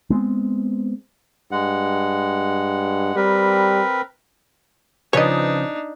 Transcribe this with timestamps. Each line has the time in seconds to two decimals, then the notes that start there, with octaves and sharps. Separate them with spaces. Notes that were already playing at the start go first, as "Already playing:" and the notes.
0.10 G#3 B3 C4
1.52 G2 G#3 F#5
3.16 G3 C4 A#4 B4
5.13 C#3 F3 D4 D#4 B4 C#5 D#5